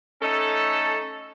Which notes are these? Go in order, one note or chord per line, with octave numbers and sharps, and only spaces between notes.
A3 C#4 D#4 A4